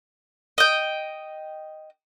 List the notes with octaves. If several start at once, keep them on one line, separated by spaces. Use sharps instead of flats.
D#5 G5